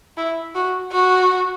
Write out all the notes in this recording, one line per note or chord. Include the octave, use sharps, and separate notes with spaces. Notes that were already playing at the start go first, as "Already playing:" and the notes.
E4
F#4
F#4